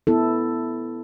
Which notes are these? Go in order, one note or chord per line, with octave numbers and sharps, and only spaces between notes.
B3 E4 A4